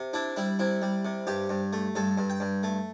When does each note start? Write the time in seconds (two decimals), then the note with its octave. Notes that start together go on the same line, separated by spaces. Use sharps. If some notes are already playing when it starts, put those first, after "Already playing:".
Already playing: C3
0.13 D4 E4
0.36 G3 E4
0.59 C3 E4
0.82 G3
1.05 C3
1.27 G2 G4
1.49 G2
1.73 A3
1.96 G2 A4
2.18 G2
2.30 G5
2.40 G2
2.63 A3